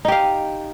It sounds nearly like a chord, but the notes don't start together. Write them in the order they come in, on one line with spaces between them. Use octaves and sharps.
D#4 G4 F5